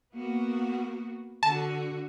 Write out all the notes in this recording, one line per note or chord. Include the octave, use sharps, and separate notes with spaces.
A#3 B3 F#4
D3 F#4 A5